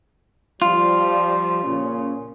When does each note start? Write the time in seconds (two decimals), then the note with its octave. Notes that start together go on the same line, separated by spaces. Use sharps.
0.62 F3 G3 F4
1.63 A#2 C#3 C#4